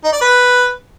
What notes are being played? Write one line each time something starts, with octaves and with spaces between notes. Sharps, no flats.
D#4
D5
B4